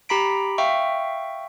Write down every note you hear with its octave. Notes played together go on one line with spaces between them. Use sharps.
G4 A#5 B5 B6 D7
E5 F5 G5 C#6